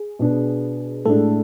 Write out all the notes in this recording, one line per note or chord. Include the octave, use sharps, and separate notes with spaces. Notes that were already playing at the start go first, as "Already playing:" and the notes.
Already playing: G#4
B2 B3 D4
A2 G#3 A3 D4 A4